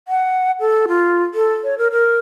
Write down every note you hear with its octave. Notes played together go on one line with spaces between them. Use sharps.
F#5
A4
F4
A4
C#5
A#4
A#4